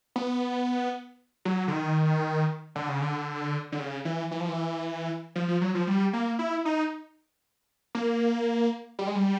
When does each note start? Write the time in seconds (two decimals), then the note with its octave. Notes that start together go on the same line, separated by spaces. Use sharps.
0.16 B3
1.45 F#3
1.68 D3
1.72 D#3
2.75 D3
2.89 C#3
3.01 D3
3.72 D3
3.80 C#3
4.05 E3
4.31 E3
4.40 F3
4.48 E3
5.36 F3
5.48 F3
5.61 F#3
5.75 F3
5.87 G3
6.13 A#3
6.39 E4
6.65 D#4
7.95 A#3
8.99 G3
9.07 G#3
9.15 G3